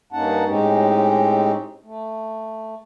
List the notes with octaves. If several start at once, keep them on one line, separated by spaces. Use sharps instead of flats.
G2 A#3 C#4 D#4 F#5 A5
A2 G#3 C4 C#4 D#4 G4
A3